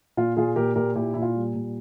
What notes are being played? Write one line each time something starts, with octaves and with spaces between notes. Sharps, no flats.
A#2 F4
A#2 F4 G#4
A#2 G4 A#4
A#2 G4 A#4
A#2 E4 G4
A#2 E4
F4
G3
A#2